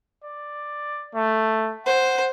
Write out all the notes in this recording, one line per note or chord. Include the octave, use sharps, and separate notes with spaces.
D5
A3
C5 F#5